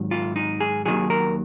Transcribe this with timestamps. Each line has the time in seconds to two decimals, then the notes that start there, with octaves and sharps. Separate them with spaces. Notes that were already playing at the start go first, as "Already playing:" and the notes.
Already playing: G#2 D#3 F#3
0.11 F4
0.36 D#4
0.61 G#4
0.85 D#2 D#3 F#3 G#4
1.10 A#4